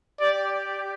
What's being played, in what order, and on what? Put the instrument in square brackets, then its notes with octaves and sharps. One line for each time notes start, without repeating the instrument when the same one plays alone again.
[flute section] G4 [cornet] D5